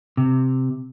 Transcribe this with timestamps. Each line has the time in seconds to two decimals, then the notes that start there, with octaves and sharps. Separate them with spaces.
0.17 C3